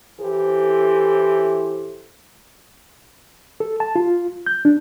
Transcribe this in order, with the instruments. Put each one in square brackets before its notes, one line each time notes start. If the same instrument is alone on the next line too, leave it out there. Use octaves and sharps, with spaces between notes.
[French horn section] E3 E4 G4 A4 C5
[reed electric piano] A4
A5
F4
G6
D4